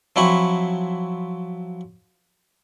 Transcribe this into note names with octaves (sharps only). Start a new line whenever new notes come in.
F3 F#3 C4 E4 B5 C#6